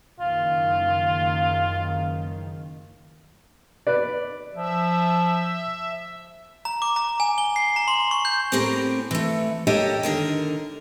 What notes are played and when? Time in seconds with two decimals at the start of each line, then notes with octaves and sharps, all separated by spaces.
0.19 F#1 D#3 F4
3.87 B4 D5
4.55 F3 E5
6.65 A#5
6.82 D6
6.96 A#5
7.20 G#5
7.38 G7
7.56 C7
7.76 A#5
7.88 C6
8.11 C#6
8.25 G6
8.52 A2 C4 G4 G#4 A#4 A#5
9.11 E3 A3
9.67 A#3 G4 A4 A#4 C#5 D#5
10.03 D3 D#3 A#4